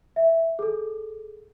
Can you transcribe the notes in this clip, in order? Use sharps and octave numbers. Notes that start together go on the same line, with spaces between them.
E5
G#4 A4